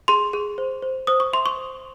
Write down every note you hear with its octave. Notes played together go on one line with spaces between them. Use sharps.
G#4 C6
G#4
C5
C5
C5 D#6
C#6
E5 C6
C#6
C5